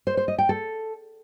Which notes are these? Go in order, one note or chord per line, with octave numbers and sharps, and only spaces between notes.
C5
C5
D#5
G5
A4